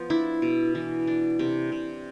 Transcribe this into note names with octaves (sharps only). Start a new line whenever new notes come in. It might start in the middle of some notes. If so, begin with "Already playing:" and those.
Already playing: F3 B3
D4 E4
B2
E3
D4
C3
C3